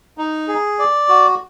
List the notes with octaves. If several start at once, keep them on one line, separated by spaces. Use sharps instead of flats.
D#4
G#4
D5
F#4